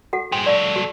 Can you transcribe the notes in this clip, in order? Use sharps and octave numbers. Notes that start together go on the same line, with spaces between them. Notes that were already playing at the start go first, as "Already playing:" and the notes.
F#4 A4 F#5
G#4 C5 G5
F#3 A4 D5 F5
F#4